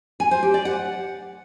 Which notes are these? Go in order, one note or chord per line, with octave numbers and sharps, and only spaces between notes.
G#5
C5
G4
D5
F#5